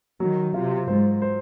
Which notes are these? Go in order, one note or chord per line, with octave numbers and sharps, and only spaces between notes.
D#3 F#3
C3 F4
G#2 C5
C5